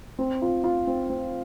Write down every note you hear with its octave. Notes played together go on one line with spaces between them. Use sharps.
C4
F4
F4
C4
C4